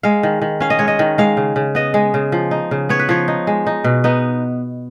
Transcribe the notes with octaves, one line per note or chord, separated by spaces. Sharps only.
G#3 F5
D#3
D#3
C#4 F5
D#5
G#3 C#5
D#5
D#3
G#3 F5
C#3
C#3
B3 D#5
G#3
C#3
F3
D#4
C#3
B3 C#5
B4
F3 C#5
D#4
G#3
D#4
B2
B3 D#4